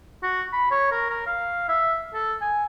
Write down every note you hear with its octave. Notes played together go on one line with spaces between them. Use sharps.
F#4
B5
C#5
A#4
A#4
F5
E5
A4
G#5